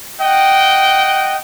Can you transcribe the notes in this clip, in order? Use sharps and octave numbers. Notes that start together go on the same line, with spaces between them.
D#5 F#5 G5